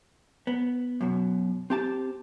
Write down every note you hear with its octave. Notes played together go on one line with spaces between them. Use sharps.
B3
F#2 B2
C4 G4 A5